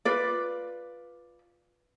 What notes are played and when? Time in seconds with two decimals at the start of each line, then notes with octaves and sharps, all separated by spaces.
0.05 F4 B4 D5